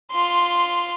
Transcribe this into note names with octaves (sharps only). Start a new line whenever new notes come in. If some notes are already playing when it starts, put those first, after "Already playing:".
F4 C6